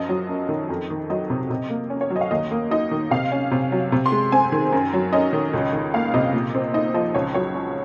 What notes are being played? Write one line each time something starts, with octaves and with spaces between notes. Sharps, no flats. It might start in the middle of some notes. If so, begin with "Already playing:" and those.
Already playing: F#2 F3 D#5
F#3
F#2
D#3
F2
D#3
F#3 D#5
C3
C3
A#3
C#4
C#5
F#3
D#5
F5
D#2 D#5
A#3
D#4 D#5
D#3
C3 F5
C#4
C3
F#3
C3
C6
G#3
C4 G#5
D#3
F#2
F#3
C#4 D#5
D#3
C#2
D#3
A#3 F5
C3 D#5
A#2
C4
D#4 D#5
F3 D#5
C#2 C#5
F#3 C#5
C#4